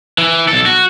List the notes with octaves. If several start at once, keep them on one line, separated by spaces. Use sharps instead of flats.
E3
B1 A4
F#4